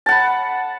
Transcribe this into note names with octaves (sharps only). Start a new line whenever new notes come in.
F#5 A5 B5